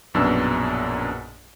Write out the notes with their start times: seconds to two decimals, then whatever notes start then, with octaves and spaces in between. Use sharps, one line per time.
0.14 A#1 F#2 B2 D4 E6